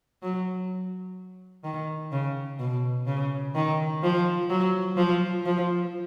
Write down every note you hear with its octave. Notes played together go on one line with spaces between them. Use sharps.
F#3
D#3
C#3
B2
C#3
D#3
F3
F#3
F3
F3